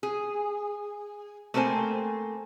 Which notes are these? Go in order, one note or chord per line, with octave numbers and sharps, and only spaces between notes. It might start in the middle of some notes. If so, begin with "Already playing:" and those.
G#4
A3 A#3 C4 B4 C5 G#5